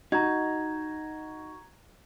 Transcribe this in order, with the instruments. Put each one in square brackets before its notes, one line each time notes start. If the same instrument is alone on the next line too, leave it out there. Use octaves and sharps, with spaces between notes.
[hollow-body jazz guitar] D#4 [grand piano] F#4 [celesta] A#5 G#6